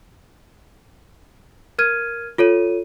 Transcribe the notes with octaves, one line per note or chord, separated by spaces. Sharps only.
A#4 F6 G#6 D#7
F4 A4 C#5 D#7